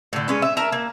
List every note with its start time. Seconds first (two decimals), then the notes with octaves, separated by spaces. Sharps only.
0.13 A2 D3
0.28 G#3 C#4 B4
0.42 E5
0.57 A#4 E5 A5
0.72 A#3